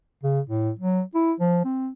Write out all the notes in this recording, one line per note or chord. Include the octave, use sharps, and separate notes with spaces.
C#3
A2
F#3
E4
F3
C4